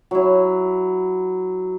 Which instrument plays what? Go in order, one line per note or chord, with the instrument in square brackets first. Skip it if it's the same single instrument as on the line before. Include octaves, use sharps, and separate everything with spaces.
[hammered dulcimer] F#3 E4